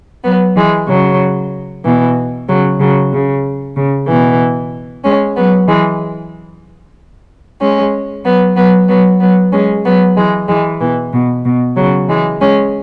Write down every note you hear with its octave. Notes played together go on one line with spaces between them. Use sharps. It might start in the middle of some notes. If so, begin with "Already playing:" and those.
F#3 B3
E3 G#3
C#3 F#3
B2 E3
C#3 F#3
C#3 F#3
C#3
C#3
B2 E3
G#3 C#4
F#3 B3
E3 G#3
G#3 C#4
F#3 B3
F#3 B3
F#3 B3
F#3 B3
G#3 C#4
F#3 B3
E3 G#3
E3 G#3
B2 E3
B2
B2
C#3 F#3
E3 G#3
G#3 C#4